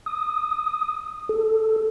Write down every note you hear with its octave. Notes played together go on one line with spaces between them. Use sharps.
D#6
A4